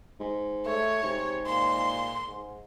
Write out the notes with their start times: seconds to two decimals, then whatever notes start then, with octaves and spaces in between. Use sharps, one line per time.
0.20 G#2
0.66 A3 C#5
1.03 G#2 C3
1.46 A#2 C6
2.27 G#2